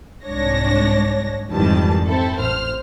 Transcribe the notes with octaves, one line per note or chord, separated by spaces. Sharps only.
C2 G#2 D4 C#5 A#6
F2 G#2 D#3 E3 G3 A5
C4 E4 A4
A1 C5 F6